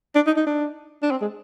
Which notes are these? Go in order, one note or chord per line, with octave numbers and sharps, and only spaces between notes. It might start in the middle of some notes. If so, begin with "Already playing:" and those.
D4
D#4
D#4
D4
D4
C4
G#3